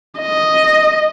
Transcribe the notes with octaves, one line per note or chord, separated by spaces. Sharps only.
D#5